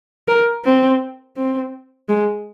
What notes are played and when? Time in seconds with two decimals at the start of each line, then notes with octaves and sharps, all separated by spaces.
0.28 A#4
0.64 C4
1.36 C4
2.08 G#3